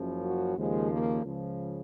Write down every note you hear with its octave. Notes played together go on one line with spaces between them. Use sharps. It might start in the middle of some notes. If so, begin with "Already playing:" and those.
Already playing: F#1 F#2 C#3 F3
F#4
D#2 C#3 F3 G#3
A#3
C#2 C#3 F3